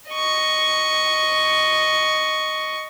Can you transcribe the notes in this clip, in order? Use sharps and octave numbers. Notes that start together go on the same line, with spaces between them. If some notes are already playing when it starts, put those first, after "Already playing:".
D#5 C#6